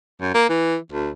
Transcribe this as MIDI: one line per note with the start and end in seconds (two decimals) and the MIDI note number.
0.21 0.34 42
0.34 0.47 58
0.49 0.77 52
0.92 1.09 38